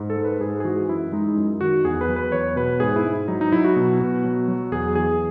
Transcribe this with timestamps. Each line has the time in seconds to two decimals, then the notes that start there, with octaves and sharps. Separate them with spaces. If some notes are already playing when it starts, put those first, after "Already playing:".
Already playing: G#2
0.10 A4
0.17 G#3
0.24 B4
0.41 G#2 G#4
0.60 G#4
0.65 E3 F#4
0.88 F#2 E4
1.12 G#3 D#4
1.37 F#2
1.61 D#3 F#4
1.85 E2 G#4
2.01 B4
2.09 F#3
2.16 B4
2.32 E2 C#5
2.56 B2 B4
2.80 G#2 G#4
2.96 E4
3.05 G#2
3.28 F#3 D#4
3.41 D#4
3.52 F#3 E4
3.64 F#4
3.76 B2
4.00 B2
4.24 F#3
4.48 F#3
4.72 E2 G#4
4.95 E3 G#4